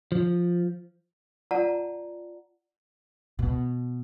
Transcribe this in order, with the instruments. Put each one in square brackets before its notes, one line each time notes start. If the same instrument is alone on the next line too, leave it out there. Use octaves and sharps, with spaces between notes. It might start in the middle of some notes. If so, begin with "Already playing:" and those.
[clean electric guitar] F3
[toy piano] F4 D5 F#5 A5 A#5
[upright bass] B2